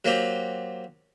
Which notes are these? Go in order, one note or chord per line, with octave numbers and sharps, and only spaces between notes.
F#3 A#3 C4 G4